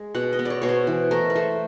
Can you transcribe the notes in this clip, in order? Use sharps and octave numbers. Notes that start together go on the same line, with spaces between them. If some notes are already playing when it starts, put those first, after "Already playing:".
Already playing: G#3
B2 F#5
D#5
B3
D5
C#5
B2 C#5
C5
E3
A3 A#4
B4
A3 C5